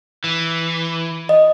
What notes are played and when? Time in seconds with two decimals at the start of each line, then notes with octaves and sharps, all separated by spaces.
0.24 E3
1.29 D#5